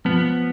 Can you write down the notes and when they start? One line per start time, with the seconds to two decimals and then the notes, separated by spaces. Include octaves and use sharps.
0.05 F3 B3